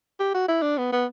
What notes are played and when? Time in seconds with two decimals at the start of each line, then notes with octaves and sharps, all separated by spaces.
0.20 G4
0.34 F#4
0.48 E4
0.62 D4
0.78 B3
0.92 B3